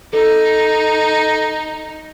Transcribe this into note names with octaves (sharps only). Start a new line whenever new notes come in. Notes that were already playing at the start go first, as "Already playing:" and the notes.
D#4 A4